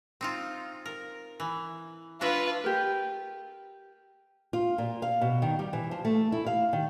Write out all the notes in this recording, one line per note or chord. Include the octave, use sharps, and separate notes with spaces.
C4 D#4 F4
A#4
E3
D4 F4 F#4 B4 E5
G4 A#4
F4
A#2
F5
B2
D#3
G3
E3
F3
A3
E4
F5
D#3